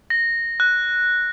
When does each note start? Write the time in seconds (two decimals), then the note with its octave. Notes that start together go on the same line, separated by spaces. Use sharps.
0.10 A#6
0.60 F#6